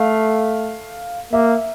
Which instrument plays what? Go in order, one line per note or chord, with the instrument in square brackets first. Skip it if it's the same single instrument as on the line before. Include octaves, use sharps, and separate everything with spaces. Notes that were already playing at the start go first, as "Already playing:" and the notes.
Already playing: [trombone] A3 [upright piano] F5
[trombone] A#3 [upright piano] E5